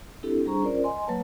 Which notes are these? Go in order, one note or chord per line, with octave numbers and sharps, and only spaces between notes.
C4 D4 E4 G4 A4
G3 D4 G#4 C5 A#5 C#6
C#4 F4 A#4 C5 D5
D#5 G#5 C6
F#3 A#3 B4 C#5 A5